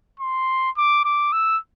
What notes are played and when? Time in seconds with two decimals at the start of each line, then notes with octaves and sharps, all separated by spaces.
0.20 C6
0.77 D6
1.05 D6
1.32 E6